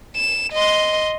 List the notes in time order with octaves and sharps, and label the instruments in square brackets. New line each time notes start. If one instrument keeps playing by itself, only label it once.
[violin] E7
D#5 C6